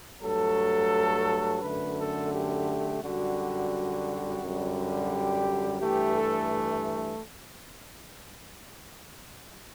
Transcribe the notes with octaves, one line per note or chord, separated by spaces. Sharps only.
G2 F#3 A3 A4
F#2 D3 A3 B4
A4
G4
F#2 D3 G3 F#4
F#2 D3 G3
G4
G2 E3 A3 G4
A4